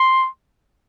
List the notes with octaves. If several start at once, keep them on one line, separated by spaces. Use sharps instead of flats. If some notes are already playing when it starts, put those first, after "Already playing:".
Already playing: C6